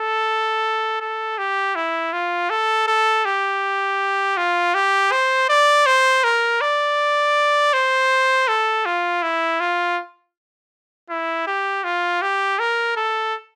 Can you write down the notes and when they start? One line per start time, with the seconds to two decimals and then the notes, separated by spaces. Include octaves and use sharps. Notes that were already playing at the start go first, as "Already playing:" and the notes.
Already playing: A4
1.01 A4
1.38 G4
1.75 E4
2.13 F4
2.50 A4
2.87 A4
3.25 G4
4.37 F4
4.75 G4
5.12 C5
5.49 D5
5.86 C5
6.24 A#4
6.61 D5
7.73 C5
8.48 A4
8.86 F4
9.22 E4
9.60 F4
11.10 E4
11.47 G4
11.84 F4
12.22 G4
12.59 A#4
12.97 A4